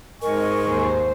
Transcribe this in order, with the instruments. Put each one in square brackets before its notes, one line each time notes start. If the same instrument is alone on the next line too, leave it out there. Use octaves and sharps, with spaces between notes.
[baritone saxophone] G#2 [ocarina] A#4 [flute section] D#5 G#5 C#6
[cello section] D#2 C5